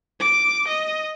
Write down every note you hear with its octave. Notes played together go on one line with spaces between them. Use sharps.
D6
D#5